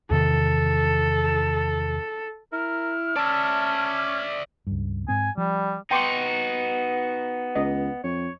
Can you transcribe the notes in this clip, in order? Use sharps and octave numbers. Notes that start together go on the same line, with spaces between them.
E2 C3 D#3 A4
E4 A#4 F6
C#4 D5 E5 A5
C#2 G2
G#2 C4 G#5
F3 G3
B3 D#4 F#4 G5 C6 D6
C#2 D#5
F2 C#5